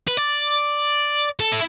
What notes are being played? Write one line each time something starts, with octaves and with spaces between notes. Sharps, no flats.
B4
D5
A4
E4